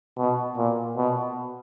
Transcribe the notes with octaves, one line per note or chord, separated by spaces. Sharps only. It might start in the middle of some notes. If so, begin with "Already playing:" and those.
B2
A#2
B2